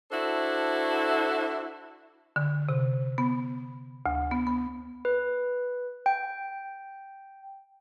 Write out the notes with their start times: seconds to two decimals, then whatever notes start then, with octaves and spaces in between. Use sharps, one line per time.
0.11 D4 E4 F#4 A4 C5
2.36 D3
2.69 C3
3.18 B3
4.06 D2
4.31 B3
4.47 B3
5.05 B4
6.06 G5